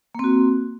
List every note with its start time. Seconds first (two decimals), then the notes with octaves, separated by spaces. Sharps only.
0.15 A#3
0.19 C4
0.24 F#4